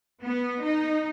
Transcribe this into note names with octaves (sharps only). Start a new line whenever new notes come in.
B3
D#4